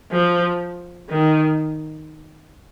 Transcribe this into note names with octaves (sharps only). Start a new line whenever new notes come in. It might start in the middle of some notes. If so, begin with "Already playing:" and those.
F3
D#3